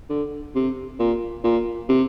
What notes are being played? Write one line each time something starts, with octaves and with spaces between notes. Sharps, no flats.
D3
C3
A#2
A#2
C3